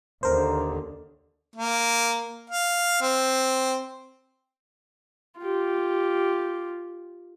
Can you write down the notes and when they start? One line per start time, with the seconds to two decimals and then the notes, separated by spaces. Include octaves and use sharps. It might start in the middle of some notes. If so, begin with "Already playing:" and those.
0.23 D#2 D3 A#4 C5
1.56 A#3
2.50 F5
3.02 C4
5.39 F4 G4